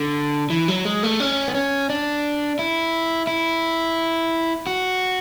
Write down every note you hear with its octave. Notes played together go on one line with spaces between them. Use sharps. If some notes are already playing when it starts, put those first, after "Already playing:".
Already playing: D3
E3
F#3
G#3
A3
C#4
B3
C#4
D4
E4
E4
F#4